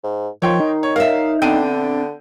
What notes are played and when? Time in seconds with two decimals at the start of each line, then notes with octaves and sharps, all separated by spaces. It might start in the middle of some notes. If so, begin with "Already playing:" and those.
0.04 G#2
0.42 D#3 F3 C#5 G5 C6
0.60 D#4
0.83 C#5
0.96 A#4 C#5 E5 F5
1.42 D3 B3 C4 D4 G5 D#7